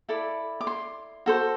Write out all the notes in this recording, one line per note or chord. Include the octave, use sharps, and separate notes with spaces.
E4 A4 D5 B5
D6
C6
F#4 A4 C5